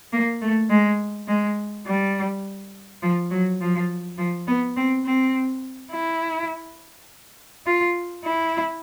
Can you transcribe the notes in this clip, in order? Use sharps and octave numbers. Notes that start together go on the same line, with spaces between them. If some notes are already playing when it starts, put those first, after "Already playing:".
A#3
A3
G#3
G#3
G3
F3
F#3
F3
F3
B3
C4
C4
E4
F4
E4